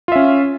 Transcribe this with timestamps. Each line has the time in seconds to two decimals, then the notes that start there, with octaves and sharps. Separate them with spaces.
0.08 F4
0.12 E5
0.16 C#4